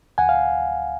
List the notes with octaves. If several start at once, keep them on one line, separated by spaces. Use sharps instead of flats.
D2 F#5 G#5
F5